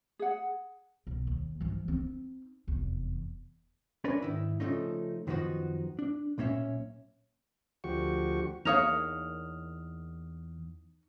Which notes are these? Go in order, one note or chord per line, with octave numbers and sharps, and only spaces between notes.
G#4 F#5
B1
D#2
E3 F3
C4 D#4
F1 E2
C#4 D4 A#4 B4 C#5 D5
G#2 D#3 E4
C#3 F3 F#3 A3 C#4 D#4
F#2 D#3 F3 B3 D#4 F#4
D4
B1 A#2 A#3 C#4 C#5 E5
D2 F3 F#4 G4 C#6
E2 A#3 D#4 C#5 F5 D#6 F6 F7